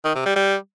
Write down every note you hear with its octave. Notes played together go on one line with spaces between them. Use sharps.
D#3
C3
G3
G3